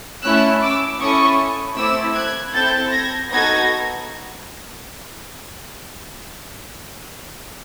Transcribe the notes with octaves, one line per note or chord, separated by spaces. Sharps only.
A3 C#4 E4 E6 F#6
D6 E6
C#4 E4 A4 C#6 D#6
A3 C4 E4 D6 E6
F#6 G#6
C4 E4 A4 G6 A6
G#6 A#6
B3 D#4 F#4 A4 G#6 A#6